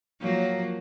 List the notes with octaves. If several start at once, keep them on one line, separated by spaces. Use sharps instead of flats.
F3 F#3 A#3